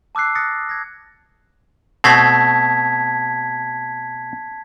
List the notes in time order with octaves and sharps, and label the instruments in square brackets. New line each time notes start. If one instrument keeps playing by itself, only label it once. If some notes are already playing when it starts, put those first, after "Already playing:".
[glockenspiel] A5 D6 E6 F#6 C7
D#6 F#6 A6 A#6 C7 C#7
G#6 A#6
[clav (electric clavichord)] B2 A3 C4 [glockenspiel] A5 G#6 B6